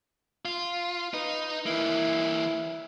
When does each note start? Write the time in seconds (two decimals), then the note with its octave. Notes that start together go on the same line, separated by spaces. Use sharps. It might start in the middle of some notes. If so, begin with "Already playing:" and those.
0.45 F4
1.14 D#4 B4
1.66 E3 A#3 E4